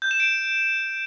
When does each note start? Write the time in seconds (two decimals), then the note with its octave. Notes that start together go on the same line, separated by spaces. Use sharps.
0.02 G6
0.11 E7
0.20 D7